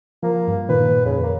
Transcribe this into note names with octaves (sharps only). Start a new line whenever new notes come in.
F3 A#3
G2
A#2 D#3 B4
F2 C#3
A#3